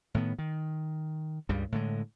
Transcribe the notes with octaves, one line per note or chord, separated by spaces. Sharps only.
A2 D#3 B3
D#3
C#2 G2 C#3 G3
A2 D3 G#3